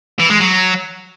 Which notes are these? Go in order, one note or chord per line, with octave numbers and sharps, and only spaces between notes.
E3
G#3
F#3